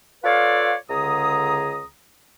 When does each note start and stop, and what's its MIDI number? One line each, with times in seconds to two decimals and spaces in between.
0.24 0.74 65
0.24 0.74 69
0.24 0.74 71
0.24 0.74 73
0.24 0.74 74
0.24 0.74 77
0.89 1.85 37
0.89 1.85 50
0.89 1.85 68
0.89 1.85 82
0.89 1.85 87